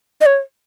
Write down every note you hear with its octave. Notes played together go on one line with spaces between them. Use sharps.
D#5
C#5